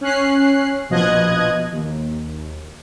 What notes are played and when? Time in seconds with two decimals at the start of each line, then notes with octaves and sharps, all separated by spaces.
0.01 C#4 F#6 C7
0.89 A#1 B2 F3 D#5 F#6 G#6
1.71 D#2